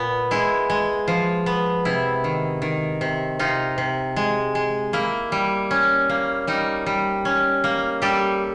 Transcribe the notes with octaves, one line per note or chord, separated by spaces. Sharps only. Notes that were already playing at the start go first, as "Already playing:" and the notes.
Already playing: A#2 B3
G#3 E4
G#3
F3
B3
C3 E4
D#3
D#3
C3
C3 D#4 F4
C3
G#3
G#3
A#3 E4
G3
C#4
A#3
G3 D#4
G3
C#4
A#3
G3 G4 A4